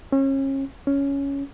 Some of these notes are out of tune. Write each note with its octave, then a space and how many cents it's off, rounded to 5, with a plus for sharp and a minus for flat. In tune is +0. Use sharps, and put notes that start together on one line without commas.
C#4 -35
C#4 +5